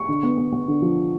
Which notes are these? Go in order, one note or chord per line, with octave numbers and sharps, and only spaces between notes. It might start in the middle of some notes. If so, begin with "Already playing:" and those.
Already playing: C#6
D3
B3
B3
B3
D3
F3